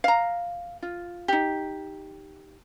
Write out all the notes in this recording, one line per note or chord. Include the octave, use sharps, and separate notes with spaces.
F5 A#5
F4
D#4 G4